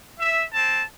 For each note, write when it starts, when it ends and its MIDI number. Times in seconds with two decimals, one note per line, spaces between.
0.20 0.43 76
0.54 0.83 60
0.54 0.83 81